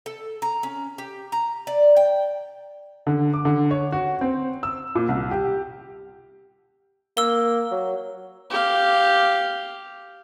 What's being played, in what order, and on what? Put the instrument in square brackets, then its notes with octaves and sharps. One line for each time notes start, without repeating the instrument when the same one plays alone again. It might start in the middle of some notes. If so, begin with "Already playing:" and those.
[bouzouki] A4
A#5
C#4
G4
A#5
D5
G5
[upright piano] D3
D6
D3
C#5
F#4
C4
E6
A#2
C2
G4
[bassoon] A#3 [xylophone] E6 G7
[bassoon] F#3
[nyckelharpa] G4 F5